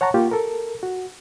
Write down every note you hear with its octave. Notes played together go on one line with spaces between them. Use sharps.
C#5 F#5 A5 A#5 C#6
A#3 F4 G4
A4 A#4
F#4